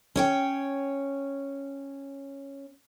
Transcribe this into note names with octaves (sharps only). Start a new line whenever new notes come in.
C#4 C#5 G5